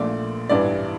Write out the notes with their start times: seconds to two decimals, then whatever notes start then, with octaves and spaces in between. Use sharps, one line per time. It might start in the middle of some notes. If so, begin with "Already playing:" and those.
Already playing: A#1 A#2 A3 D5
0.49 A1 G2 E3 D5